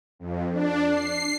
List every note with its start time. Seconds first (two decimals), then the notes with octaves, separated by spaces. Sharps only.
0.19 F2
0.52 D4
0.90 C7